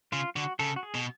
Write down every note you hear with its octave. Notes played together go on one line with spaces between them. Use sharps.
C#3 F4
D3 F#4
C#3 A4
F#4
G#4
B2